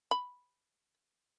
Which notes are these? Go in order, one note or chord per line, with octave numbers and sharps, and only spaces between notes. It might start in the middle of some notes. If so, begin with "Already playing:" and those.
B5